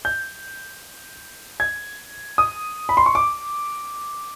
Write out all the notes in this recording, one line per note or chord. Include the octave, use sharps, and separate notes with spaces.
G6
G#6
D#6
B5
C6
C#6
D6